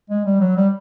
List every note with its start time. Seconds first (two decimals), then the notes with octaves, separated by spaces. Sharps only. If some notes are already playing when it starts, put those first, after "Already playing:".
0.10 G#3
0.25 G3
0.40 F#3
0.56 G3